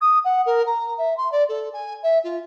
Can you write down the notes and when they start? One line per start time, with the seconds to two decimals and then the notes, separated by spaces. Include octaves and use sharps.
0.01 D#6
0.24 F#5
0.46 A#4
0.66 A#5
0.98 E5
1.17 C6
1.31 D5
1.48 A4
1.73 G#5
2.03 E5
2.24 F4